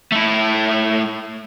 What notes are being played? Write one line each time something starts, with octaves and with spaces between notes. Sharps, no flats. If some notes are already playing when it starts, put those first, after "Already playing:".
A3 E4